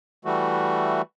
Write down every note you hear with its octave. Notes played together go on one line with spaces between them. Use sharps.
E3 G3 A3 F#4